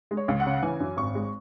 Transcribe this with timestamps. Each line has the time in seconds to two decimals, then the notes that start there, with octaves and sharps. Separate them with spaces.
0.11 G#3
0.17 C#5
0.28 C#2
0.40 F#5
0.46 C#3
0.62 E3 G#5
0.80 F#2
0.97 G#1 C#6
1.15 G#3